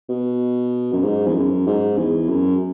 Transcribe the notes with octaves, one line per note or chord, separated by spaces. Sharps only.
B2
F#2
G#2
E2
F#2
G#2
E2
F#2